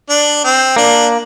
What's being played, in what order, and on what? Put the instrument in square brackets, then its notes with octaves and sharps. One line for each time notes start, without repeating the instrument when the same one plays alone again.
[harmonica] D4
C4
[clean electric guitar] A#3 [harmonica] D4